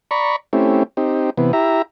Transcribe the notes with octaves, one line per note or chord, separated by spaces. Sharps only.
D5 A#5 B5 C#6
A3 C4 C#4 E4 G4
C4 D#4 G4
C3 E3 B3
E4 G4 E5 A#5